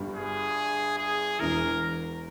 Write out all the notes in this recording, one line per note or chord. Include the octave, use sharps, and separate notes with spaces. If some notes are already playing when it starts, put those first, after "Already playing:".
Already playing: G1 G2 G3
G#4
G#4
E1 E2 E3 A#4